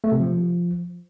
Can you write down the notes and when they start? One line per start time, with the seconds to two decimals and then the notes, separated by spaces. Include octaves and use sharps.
0.04 A3
0.12 C3
0.20 F3